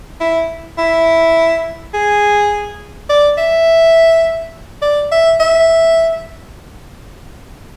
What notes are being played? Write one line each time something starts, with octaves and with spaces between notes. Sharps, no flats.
E4
E4
G#4
D5
E5
D5
E5
E5